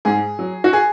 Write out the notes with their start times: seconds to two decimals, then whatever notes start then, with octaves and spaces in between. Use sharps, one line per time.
0.05 G#2 G#4
0.39 F#3
0.64 F#4
0.73 G#4